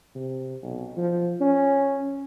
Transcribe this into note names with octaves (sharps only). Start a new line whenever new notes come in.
C3
B1
F3
C#4